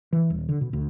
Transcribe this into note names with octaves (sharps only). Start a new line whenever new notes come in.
E3
D#1
D3
B2
D2